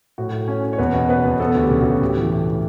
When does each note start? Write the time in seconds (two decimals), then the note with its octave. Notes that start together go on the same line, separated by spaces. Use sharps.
0.18 A2 F#4
0.33 A2
0.48 C#4
0.64 C#4
0.73 C#5
0.78 E2 B4
0.94 B2
1.09 B3 B4
1.25 E2
1.40 B3 A4
1.55 D2
1.61 G4
1.71 C#3
1.81 F#4
1.87 D2
2.01 A2 G4
2.16 E3
2.32 A2
2.48 A2